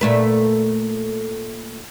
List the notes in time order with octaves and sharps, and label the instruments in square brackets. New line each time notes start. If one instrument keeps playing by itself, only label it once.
[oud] A#2 A3 B4